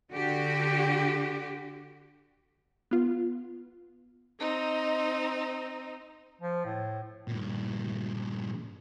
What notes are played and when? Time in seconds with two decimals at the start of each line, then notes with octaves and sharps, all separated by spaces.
0.12 D3 F#4 G4
2.91 B3 F4
4.38 C4 D#4 A#5
6.41 F3
6.65 A2
7.28 G2 A#2